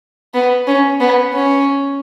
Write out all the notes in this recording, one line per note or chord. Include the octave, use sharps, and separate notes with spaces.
B3
C#4
B3
C#4